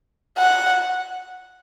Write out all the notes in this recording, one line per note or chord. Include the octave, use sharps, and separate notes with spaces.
F#5